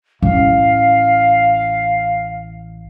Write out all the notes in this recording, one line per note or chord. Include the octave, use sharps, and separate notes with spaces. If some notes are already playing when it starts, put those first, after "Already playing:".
A1 F5